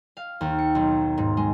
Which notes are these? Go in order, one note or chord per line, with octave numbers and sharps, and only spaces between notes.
F5
D#2
C#7
B1
G#2
G#3